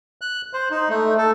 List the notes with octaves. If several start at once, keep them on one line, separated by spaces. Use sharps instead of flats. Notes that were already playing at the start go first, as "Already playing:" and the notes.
F#6
C5
D#4
A3
A4